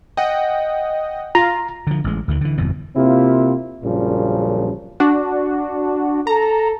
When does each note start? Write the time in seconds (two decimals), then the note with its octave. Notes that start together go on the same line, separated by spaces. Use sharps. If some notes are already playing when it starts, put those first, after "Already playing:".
0.17 D#5 F#5 G5
1.35 F4 A#5
1.87 D3 F3
2.04 A1 G#3
2.28 D2 D3 D#3
2.41 D3 E3
2.58 G1 F2 B2 E3
2.96 C3 A#3 C4 E4 F4
3.84 A#1 F#2 A#2 C#3 F3 G3
5.00 D4 F#4
6.27 A4 A#5